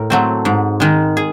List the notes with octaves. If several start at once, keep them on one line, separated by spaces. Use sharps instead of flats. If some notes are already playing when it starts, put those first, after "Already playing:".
Already playing: A2 A#4
F#3 A3 C4
G#2
D#3 G#3
G#4